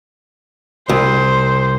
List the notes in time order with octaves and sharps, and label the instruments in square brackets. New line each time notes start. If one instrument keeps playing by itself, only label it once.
[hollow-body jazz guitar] C2 [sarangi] C5